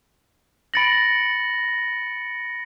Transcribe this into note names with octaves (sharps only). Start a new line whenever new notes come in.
B5 A6 A#6 C#7 D7 F#7